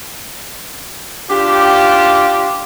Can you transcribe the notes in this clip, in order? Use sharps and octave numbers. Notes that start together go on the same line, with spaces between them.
D4 F4 G4